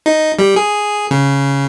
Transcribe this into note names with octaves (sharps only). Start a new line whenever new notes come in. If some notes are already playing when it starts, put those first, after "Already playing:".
D#4
G3
G#4
C#3